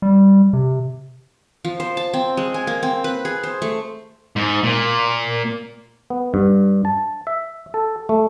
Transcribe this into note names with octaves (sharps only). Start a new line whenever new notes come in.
G3
C3
F3
C5
A5
C4
G#3
G#5
A#3
C4
B4
G#4
C5
A3
G#2
A#2
B3
G2
A5
E5
A4
A3